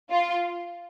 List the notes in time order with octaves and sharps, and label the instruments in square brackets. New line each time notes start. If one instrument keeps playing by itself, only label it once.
[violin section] F4